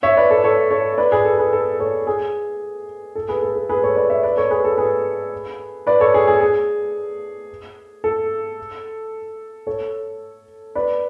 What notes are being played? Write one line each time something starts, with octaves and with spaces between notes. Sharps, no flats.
C#5 E5
B4 D5
A4
A4 C#5
A4 C#5
B4 D5
G#4 B4
A4
G#4 B4
A4
A4 C#5
G#4
A4
G#4 B4
A4
A4
G#4 B4
A4 C#5
B4 D5
C#5 E5
B4 D5
A4 C#5
G#4 B4
A4
G#4 B4
B4 D5
A4 C#5
G#4
G#4
G#4
A4
A4 C#5
B4 D5